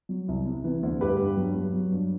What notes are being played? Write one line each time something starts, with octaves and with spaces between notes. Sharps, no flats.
F#3
C2
C3
E3
D2
G2 G4 B4
G2
F#3
F#3
F#3
G2